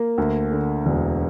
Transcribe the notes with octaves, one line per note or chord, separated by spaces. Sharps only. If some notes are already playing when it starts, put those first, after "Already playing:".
Already playing: A#3
D2
D3
E1